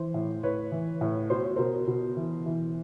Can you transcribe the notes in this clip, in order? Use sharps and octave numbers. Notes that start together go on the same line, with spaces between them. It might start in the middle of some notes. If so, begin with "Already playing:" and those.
Already playing: E3 C5
A2
A2 B4 C#5
E3
A2
B2 C5
C#5
B2 A#4 C5
B2
E3
E3